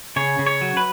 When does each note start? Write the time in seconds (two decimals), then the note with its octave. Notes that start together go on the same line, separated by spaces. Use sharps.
0.16 C#3 C#5
0.39 C#3
0.47 C#5
0.61 F#3
0.77 B4